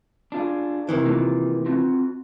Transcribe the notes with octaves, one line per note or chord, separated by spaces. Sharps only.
D4 F4 G#4
C3 D#3 E3
A#3 F4
C4 F4 F#4